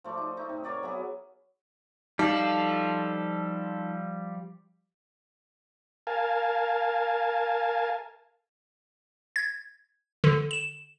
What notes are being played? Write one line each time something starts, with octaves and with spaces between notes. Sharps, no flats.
F3 A3 D5
D#4
A3 D#4
C3
A#4 C#5 D5 F#5
F#3 B3 E4 G#4
F3 G3 D#4 A4 F5
A#4 F5 G#5 A5
G#6
D3
E7